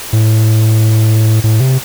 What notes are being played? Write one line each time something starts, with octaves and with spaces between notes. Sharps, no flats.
A2
A2
C3